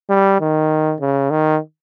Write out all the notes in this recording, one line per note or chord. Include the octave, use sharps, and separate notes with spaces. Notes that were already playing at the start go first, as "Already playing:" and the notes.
G3
D#3
C#3
D#3